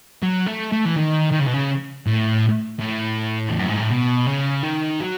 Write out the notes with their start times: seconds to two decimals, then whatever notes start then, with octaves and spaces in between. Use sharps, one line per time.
0.23 F#3
0.47 A3
0.72 A3
0.85 E3
0.96 D#3
1.32 D#3
1.40 C#3
1.47 B2
1.54 C#3
2.07 A2
2.79 A2
3.49 E2
3.59 F#2
3.69 G#2
3.80 A2
3.89 B2
4.26 C#3
4.63 D#3
5.00 F#3